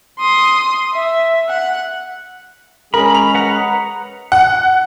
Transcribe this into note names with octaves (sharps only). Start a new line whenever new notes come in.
C6 D#6
E5
F#5
G#3 C#4 G#4 A#4 B5
F7
B4 F#5 A#5
F#5